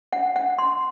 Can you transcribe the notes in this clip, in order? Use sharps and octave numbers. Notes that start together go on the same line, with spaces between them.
F#5
F#5
C6